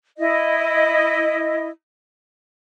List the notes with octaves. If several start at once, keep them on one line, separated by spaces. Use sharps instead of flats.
E4 D#5